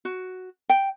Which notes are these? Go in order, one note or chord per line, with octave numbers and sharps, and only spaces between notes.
F#4
G5